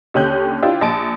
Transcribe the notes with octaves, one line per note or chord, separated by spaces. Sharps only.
D#2 D3 C#4 G4 F#6 G6
D4 E4 F4 G4 C5
A#1 A5 D7